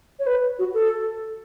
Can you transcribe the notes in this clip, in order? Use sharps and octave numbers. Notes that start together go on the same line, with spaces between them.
C#5
B4
F#4
A4